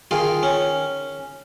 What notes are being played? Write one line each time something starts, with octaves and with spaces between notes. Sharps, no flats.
D#3 F4 G#4
C#4